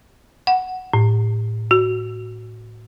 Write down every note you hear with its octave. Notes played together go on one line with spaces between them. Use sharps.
F#5
A2
F#4